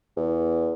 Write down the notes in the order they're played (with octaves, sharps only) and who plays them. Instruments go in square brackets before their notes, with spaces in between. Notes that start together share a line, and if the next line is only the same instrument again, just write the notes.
[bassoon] E2